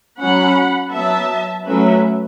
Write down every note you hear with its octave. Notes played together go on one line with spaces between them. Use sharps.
F#3 C#4 F#5 B5
F#3 B3 E5 A5
F#3 A3 C#4 B4 E5